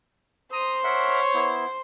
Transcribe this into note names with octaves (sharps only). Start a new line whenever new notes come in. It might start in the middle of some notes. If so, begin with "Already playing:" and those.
C5 A#5 D#6
A#4 C#5 E5 F#5
B3 E4